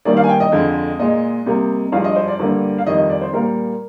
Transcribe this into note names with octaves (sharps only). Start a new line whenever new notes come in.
G2 D#3 G3 A#3 D5
F5
G#5
G5
D#5
F2 D3 G#3
A#2 G#3 D#5
C3 G3 A#3
G2 F3 G#3 F5
D#5
C5
D5
G2 D3 G3 A#3
F5
F2 D#3 G3 D#5
D#5
D5
C5
A#2 G3 A#3 A#4